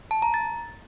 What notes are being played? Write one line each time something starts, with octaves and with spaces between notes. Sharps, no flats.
A5
A#5
A6